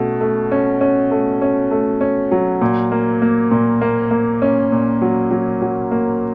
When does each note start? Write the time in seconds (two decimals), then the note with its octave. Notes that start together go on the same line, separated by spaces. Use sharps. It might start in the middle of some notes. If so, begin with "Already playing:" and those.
Already playing: B2 A3 C#4
0.21 A3
0.52 C#4
0.81 C#4
1.11 A3
1.42 C#4
1.71 A3
2.01 C#4
2.31 F#3
2.61 A#2
2.92 A#3
3.22 A#3
3.51 A#2
3.81 A#3
4.11 A#3
4.42 C#4
4.72 A#2
5.02 F#3
5.31 F#3
5.62 F#3
5.91 A#3